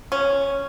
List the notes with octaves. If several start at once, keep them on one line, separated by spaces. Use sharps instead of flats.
C#4